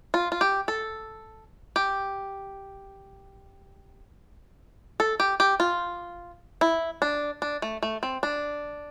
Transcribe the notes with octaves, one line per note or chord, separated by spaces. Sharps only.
F4
F4
G4
A4
G4
A4
G4
G4
F4
E4
D4
D4
A3
A3
C4
D4